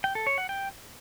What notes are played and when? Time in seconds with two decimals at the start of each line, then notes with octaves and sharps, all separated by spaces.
0.04 G5
0.15 A4
0.27 C#5
0.38 F#5
0.49 G5